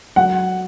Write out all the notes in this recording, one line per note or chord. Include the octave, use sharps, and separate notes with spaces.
F#3 F#5